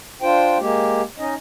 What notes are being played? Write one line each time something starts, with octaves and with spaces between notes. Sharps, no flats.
D4 F4 C5 G5
G#3 A#3 G4
C#4 D#4 D#5